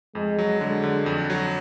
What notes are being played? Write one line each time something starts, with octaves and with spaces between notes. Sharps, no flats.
F2 G#3
F#3
D3 G#3
D3
F2
F#3